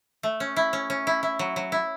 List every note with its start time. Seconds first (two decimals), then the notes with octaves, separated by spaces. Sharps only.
0.23 A3
0.40 C#4
0.56 E4
0.73 C#4
0.90 C#4
1.07 E4
1.23 E4
1.39 F#3
1.56 F#3
1.72 E4